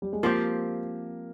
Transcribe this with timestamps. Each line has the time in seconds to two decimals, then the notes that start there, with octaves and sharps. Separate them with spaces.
0.02 G3
0.13 G#3
0.23 F3 A#3 C4 G4